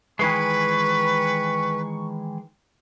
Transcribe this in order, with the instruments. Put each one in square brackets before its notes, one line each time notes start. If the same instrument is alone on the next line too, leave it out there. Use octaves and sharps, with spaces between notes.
[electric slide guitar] D#3 E3 G#3 [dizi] B4 [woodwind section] C#6